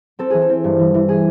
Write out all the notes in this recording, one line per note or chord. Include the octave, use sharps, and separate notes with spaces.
C4 A4
E3 G#4
A4
C4
G2
E3
E3
G#4